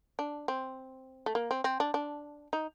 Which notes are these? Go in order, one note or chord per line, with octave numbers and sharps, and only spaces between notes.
D4
C4
A3
A#3
C4
C4
D4
D4
D#4